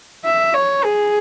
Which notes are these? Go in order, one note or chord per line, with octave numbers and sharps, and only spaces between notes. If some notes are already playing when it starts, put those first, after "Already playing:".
E5
C#5
G#4